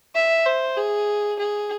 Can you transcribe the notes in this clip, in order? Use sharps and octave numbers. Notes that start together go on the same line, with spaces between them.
E5
C5
G#4
G#4